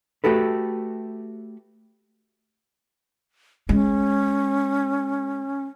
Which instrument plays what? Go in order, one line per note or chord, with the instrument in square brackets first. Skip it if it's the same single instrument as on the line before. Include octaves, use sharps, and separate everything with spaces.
[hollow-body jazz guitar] A3 F#4 G4 A4 B4
[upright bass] G#3 [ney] C#4